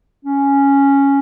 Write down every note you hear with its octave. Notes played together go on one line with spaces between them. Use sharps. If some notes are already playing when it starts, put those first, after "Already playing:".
C#4